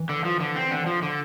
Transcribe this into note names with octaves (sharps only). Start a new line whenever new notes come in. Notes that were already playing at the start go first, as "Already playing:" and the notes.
Already playing: E3
D3
F3
D3
C4
D3
F3
D3